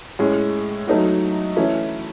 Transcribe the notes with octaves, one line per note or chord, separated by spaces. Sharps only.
A2 G#3 C#4
F#3 A3 D#4 F#4
E3 A3 C#4 E4